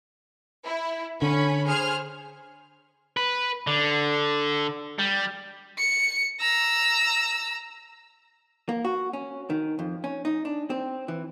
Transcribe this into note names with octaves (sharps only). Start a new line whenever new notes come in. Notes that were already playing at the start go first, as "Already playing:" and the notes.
E4
D3 C#4 B5
G#4 C5 F6
B4
D3
G3
C#7
A#5 E6
A#3
F#4
C#4
D#3
F2
C#4
D#4
D4
C4
E3